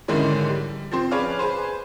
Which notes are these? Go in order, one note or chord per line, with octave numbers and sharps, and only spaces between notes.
G#2 D3 D#3 G#3 C#4 E4
G3
F3 C4 C5
G#4 B4 C#5 D5 F5
G#4 B4 C5